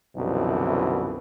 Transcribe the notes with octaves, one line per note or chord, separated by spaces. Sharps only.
C2 F#2 B2 D3 E3 F3